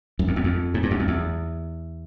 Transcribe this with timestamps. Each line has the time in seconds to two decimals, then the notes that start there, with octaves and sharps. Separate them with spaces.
0.19 F#2
0.28 F2
0.36 E2
0.44 F2
0.74 G#2
0.83 G2
0.91 F#2
1.00 F2
1.08 E2